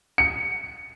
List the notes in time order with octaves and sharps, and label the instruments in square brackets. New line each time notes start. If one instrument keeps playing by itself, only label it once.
[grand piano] C#7